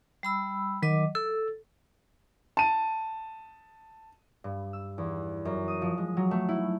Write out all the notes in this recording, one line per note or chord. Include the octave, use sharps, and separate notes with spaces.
G3 B5 E6
D#3 F#3 D#5 D6
A4 E6
A5 D#7
G2
E6
E2
F#2
D#6
F3
G#3
F#3
A3
E4